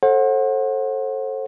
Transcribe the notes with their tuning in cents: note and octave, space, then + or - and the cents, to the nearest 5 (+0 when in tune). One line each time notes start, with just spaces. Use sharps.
A4 +0 C5 +40 F#5 -15